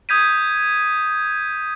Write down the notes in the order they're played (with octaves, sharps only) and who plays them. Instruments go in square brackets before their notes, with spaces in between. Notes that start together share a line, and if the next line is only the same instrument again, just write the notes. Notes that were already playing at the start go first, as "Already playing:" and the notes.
[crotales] D#6 G6 G#6 B6 D#7